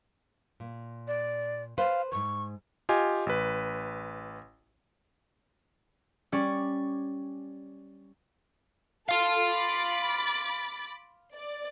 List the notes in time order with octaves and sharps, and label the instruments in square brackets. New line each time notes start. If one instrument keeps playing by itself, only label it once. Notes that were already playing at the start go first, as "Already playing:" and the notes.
[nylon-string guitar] A#2
[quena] D5
[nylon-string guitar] B4 C5 [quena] F5
[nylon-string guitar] E2 G#2 [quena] C#6
[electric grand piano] F4 G4 D#5 G#5
A1 B4
[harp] G3 C#4 D5 C#6
[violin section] A4 [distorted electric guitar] F5 C6
[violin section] B5 D6 A6
D5